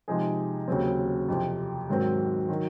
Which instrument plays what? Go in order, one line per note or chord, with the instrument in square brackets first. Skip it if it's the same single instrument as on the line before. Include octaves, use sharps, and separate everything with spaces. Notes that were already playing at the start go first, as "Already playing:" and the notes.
[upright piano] C3 F3 G#3 D#4 G#4
D#2 C#3 F#3 C4
F2 C3 F3
G#2 D#3 F#3 C4
D#3 F#3